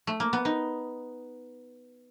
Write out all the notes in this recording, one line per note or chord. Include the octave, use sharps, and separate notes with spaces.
A3
A#3
B3
D#4